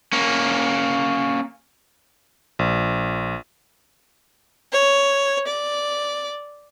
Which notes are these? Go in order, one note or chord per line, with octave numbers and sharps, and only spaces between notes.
A#3 C#4
A#1
C#5
D5